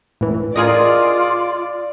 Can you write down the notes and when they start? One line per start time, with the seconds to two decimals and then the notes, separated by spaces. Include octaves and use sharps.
0.21 A2 E3
0.56 F4 G#4 A#4 D5 D#5